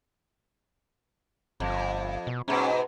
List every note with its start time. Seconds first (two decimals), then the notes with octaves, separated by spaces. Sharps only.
1.60 G1 F2
2.27 B2
2.48 G#2 B2 C#4